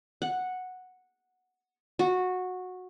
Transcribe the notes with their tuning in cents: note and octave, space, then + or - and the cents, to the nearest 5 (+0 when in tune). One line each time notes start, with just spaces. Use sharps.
F#5 -5
F#4 -15